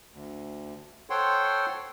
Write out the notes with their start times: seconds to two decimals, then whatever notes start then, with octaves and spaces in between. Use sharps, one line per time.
0.12 D2
1.10 A4 C5 C#5 F#5 G5 C6